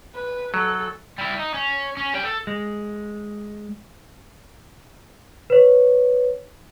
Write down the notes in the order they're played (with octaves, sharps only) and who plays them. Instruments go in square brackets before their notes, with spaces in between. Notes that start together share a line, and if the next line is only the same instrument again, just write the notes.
[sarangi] B4
[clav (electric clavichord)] F#3 [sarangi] A4
[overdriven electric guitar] G3 E4
D#4
C#4
C#4
G3 G5
A4
[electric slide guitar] G#3
[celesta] B4 C#5